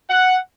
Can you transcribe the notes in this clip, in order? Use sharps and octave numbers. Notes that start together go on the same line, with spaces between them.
F#5